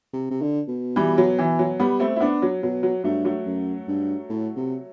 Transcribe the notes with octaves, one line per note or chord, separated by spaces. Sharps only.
C3
C3
D3
B2
E3 G3
F#3
E3
F#3
G3 B3
A3 C4
E4
B3 D4
F#3
B2 F#3
F#3
G2 F#3 A3
F#3 A3
F#2
G2
A2
C3